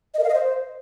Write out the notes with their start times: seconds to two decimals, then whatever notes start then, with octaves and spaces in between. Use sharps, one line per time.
0.14 D#5
0.19 A#4
0.24 F5
0.29 D#5
0.34 C5